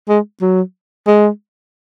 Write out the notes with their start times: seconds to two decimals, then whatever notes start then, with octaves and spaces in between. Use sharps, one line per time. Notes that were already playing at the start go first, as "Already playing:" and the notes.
0.09 G#3
0.42 F#3
1.08 G#3